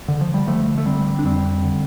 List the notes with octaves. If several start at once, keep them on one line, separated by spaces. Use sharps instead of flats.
D3
F3
G3
D3 F3 A3
A3
D3 G3 C4
D4
F2 G3 C4
D3